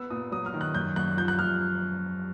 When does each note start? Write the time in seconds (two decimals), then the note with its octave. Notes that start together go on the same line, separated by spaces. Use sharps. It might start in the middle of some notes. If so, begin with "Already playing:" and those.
Already playing: B3 E6
0.10 A#2 D#6
0.32 F#3 D#6
0.46 F6
0.54 D#3
0.61 F#6
0.75 F#2 G6
0.96 F#2 F#6
1.17 F3 G6
1.28 F#6
1.39 F3 F6